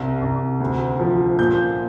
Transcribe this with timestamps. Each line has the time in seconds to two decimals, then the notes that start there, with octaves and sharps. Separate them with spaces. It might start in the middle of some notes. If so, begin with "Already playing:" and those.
Already playing: C2
0.21 C2
0.60 D2
0.99 F3
1.39 A#2 G6